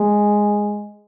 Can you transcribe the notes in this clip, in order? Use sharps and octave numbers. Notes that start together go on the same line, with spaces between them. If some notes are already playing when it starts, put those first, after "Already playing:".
Already playing: G#3